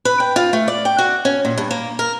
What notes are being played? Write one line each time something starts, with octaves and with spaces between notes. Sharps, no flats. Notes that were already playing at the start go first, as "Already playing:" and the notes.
B4
G5
F4
A3
D5
G5
F#4
C#4
A#2
G2
A#3
A#4